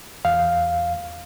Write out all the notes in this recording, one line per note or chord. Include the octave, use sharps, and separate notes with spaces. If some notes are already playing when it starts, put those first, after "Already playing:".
E2 F5